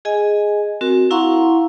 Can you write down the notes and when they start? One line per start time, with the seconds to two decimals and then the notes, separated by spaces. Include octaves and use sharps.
0.05 G#4 D#5 G#5
0.81 C4 F#4 A#4
1.11 E4 F5 F#5 A#5 C6 C#6